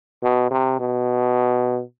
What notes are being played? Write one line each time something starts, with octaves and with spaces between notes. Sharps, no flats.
B2
C3
B2